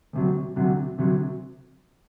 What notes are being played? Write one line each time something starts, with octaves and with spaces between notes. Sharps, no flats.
D2 C3 F#3
D2 C3 F#3
D2 C3 F#3